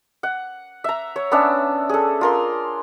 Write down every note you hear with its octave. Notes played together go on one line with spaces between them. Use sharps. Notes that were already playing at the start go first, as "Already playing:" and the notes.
F#5
E5 A#5
C#5
B3 C#4 D4 E5
G#4 A4
F4 A#4 C6